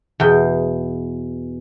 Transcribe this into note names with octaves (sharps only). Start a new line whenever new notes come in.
E2 B2 G5